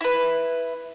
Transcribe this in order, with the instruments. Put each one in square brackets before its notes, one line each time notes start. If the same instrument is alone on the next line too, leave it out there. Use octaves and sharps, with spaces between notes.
[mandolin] E4 B4